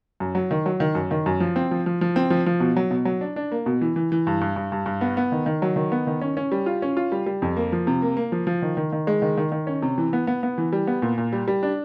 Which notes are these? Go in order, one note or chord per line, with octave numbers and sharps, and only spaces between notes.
F#2
F#3
D#3
F#3
D#3
F#2
D#3
F#2
F3
C4
F3
F3
F3
C4
F3
F3
B2
F#3
B2
F#3
D4
D4
A#3
B2
E3
E3
E3
G2
G2
G2
G2
G2
B3
B3
D#3
D#3
F#3
D#3
B3
D#3
C#4
C#4
G3
F4
C#4
F4
G3
G3
F2
A#3
F3
C3
A#3
A#3
F3
F3
D#3
D#3
D#3
G#3
D#3
D#3
D#3
C#4
C3
E3
B3
B3
B3
E3
G3
B3
A#2
A#2
G3
G3
D4